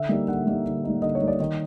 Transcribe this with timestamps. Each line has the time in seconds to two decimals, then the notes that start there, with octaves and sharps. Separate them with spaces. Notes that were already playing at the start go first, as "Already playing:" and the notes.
Already playing: D3 E5
0.09 G3 A#3 D#4
0.28 D3 F#5
0.47 G3 A#3 D#4
0.66 D3
0.84 G3 A#3 D#4
1.02 D3 D#5
1.15 C#5
1.21 G3 A#3 D#4
1.28 D5
1.40 D#3 D#5